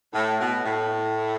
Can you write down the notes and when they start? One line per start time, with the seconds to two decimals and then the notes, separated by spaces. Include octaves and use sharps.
0.14 A2
0.39 B2
0.65 A2